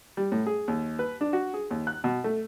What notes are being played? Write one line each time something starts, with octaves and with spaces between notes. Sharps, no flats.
G3
A2
G#4
D#2
B4
D4
F#4
G#4
D#2
F#6
B2
A3